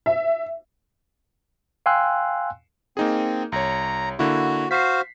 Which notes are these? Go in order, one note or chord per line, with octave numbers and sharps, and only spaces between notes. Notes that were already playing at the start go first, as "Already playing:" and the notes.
E5
F5 G5 G#5 C6 E6 F#6
A#3 C4 D#4 G#4
C2 C#5 A#5
D3 A#3 E4 F#4
F#4 C5 F5 B6 C7